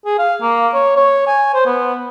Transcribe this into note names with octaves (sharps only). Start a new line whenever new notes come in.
G#4
F5
A#3
C#5
C#5
G#5
C5
B3